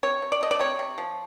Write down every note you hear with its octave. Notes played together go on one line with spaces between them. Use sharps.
C3 C#5
C3
D5
A3 D#5
D5
C3 C#5
C3
F3